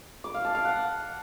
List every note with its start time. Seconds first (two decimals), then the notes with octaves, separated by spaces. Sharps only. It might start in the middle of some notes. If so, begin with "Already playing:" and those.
0.24 D6
0.34 F5
0.45 A5
0.55 F5
0.65 F#5